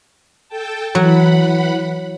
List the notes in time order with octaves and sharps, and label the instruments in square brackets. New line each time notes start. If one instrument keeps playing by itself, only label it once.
[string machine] A4 G5 A5
[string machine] E3 F#5 B5 [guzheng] F#3